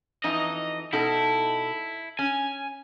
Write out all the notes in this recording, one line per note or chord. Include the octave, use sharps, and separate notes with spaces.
F2 E3 D#4 D#5
B2 D#4 E4 A4
C#4 G#5